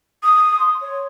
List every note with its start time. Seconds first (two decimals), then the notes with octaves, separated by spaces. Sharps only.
0.23 D#6
0.60 C6
0.81 C#5